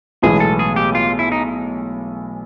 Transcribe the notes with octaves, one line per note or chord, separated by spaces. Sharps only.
B1 A2 E3 G#3 B3 G#4
A4
G#4
G4
F4
E4
D#4